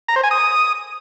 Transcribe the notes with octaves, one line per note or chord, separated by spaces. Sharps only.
A#5
C5
G#5
D#6